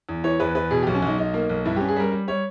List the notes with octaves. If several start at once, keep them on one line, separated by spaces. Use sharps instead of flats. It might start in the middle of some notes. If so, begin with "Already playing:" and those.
E2
E3 C#5
E2 B4
E2 B4
B2 G#4
B1 G4
C#4
B1 D#4
B1 D#4
A#3
B1
G2 E4
C#4 G4
G#4
G3 A#4
G3
G3 C#5